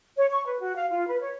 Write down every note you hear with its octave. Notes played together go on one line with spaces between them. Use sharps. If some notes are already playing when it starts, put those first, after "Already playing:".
C#5
C#6
B4
F#4
F5
F4
B4
C#5